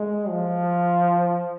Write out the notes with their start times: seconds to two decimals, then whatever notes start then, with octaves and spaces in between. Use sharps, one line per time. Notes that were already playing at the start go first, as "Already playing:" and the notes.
Already playing: G#3
0.29 F3